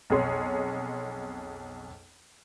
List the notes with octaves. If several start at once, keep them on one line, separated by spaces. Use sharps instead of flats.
B1 F2 G#4 C#5 C6